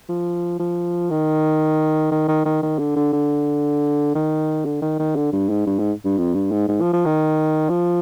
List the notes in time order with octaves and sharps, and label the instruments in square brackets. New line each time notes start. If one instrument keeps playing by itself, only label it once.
[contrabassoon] F3
F3
D#3
D#3
D#3
D#3
D#3
D3
D3
D3
D#3
D3
D#3
D#3
D3
G2
G#2
G2
G#2
G2
F2
G2
G#2
G#2
F3
F3
D#3
F3